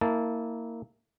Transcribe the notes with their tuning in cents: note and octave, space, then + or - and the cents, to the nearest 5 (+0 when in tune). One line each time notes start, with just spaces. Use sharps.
A#3 -15 E4 -25 A5 +0